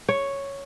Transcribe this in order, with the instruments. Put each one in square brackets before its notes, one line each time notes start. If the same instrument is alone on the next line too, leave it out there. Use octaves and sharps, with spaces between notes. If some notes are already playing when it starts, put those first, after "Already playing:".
[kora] C#5